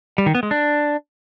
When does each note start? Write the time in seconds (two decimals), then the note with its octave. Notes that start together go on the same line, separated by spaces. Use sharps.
0.18 G3
0.26 D#3
0.35 B3
0.43 G#3
0.51 D4